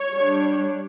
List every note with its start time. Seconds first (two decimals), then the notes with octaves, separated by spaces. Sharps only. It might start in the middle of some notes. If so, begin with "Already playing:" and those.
Already playing: C#5
0.12 G3 D4